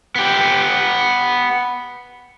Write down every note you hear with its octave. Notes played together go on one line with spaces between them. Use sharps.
B3 G4